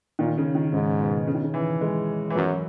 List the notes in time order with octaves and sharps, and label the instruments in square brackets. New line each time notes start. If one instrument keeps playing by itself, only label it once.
[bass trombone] A#2 [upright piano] D#3
[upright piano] C#3
D#3
[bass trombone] G#2 [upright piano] C#3
[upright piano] B2
C#3
D#3
C#3
E3
G#3
E3
[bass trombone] F#2 [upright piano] F#3